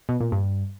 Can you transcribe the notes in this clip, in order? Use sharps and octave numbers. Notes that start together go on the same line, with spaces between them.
B2
A#2
G2